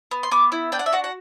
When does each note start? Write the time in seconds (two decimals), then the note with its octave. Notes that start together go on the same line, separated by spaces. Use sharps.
0.11 B3
0.23 C6
0.31 B3 D6
0.52 E4
0.72 D4 G5
0.79 F#5
0.86 E5
0.93 F#4 F#5
1.04 F#5